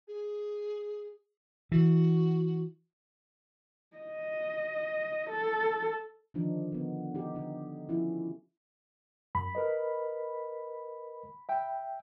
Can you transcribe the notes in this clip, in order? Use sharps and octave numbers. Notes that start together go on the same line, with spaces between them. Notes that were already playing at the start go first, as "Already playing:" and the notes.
G#4
E3 F#4
D#5
A4
D3 D#3 F3 D4 D#4
D3 B3
D#4 G4
D3 D#4
F3 C#4 E4
F#2 B5
A#4 B4 D#5
E5 G5